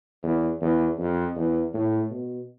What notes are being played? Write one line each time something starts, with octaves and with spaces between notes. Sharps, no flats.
E2
E2
F2
E2
A2
B2